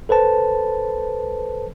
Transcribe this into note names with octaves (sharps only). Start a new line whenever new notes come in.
A4 B4 C5 A5